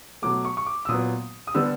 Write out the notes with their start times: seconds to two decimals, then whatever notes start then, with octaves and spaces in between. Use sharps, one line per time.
0.22 B2 F#3 A3 D6
0.45 C#6
0.57 C#6
0.66 D6
0.85 E6
0.89 A#2 F#3 B3 D#6
1.47 D#6
1.54 D3 G3 B3 E6